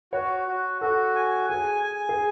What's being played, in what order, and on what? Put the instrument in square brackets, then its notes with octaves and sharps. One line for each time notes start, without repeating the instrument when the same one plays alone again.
[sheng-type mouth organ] F#4 [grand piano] C#5
[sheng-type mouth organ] F#4
[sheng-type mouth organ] F#4 [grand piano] A4
[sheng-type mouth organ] G#5
[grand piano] G#4 [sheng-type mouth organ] G#5
[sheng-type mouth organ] G#5
[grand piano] G#4